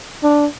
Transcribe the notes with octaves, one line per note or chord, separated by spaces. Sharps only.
D4